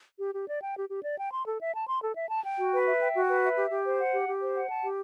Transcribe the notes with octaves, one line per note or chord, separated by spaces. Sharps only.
G4
G4
D5
G5
G4
G4
D5
G5
C6
A4
E5
A5
C6
A4
E5
A5
G5
F#4
B4
E5
G5
F#4
B4
E5
G4
G4
C5
F#5
G4
G4
C5
F#5
A5
G4